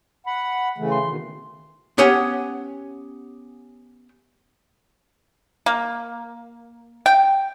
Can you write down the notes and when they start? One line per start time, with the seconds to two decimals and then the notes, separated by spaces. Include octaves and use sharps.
0.26 F#5 B5
0.78 C#3 E3 A3
0.91 C6
1.07 B2 D#3
1.98 B3 C#4 G4 C#5 F#5 G#5
5.66 A#3
7.06 G5